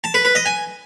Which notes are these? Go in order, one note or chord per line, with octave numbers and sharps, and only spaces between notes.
A5
B4
B4
D#5
G#5